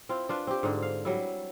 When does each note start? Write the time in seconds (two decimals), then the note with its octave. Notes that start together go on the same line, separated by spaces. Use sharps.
0.09 C4 E4 F4
0.29 D4 F4 B4
0.47 C4 G4
0.63 G#2 D3
0.82 F5
1.05 F#3 G3 E4